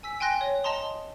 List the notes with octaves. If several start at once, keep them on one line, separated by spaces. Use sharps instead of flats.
G#5 E6 B6
G5 G#5 C6 F#6 A#6
C#5
D#5 A5 A#5 C6 D#6